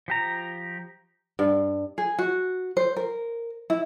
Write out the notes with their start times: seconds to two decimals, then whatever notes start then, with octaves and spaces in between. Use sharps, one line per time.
0.08 F3 G4 A#5
1.39 G2
1.98 G#4
2.19 F#4
2.77 C5
2.96 A#4
3.70 E4